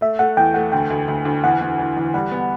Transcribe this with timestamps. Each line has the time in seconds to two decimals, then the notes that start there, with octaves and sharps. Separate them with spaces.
0.01 A3 E5
0.19 A3 F#5
0.37 E2 G5
0.54 A3 F#5
0.72 D2 G5
0.90 D2
1.08 D2
1.25 D2
1.44 E2 F#5
1.61 E2
1.79 E3
1.96 E2
2.14 G3 F#5
2.31 B3